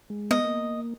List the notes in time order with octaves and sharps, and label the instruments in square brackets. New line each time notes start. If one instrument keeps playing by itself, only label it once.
[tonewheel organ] G#3
[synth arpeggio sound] B3 [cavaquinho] D#5
[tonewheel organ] A#3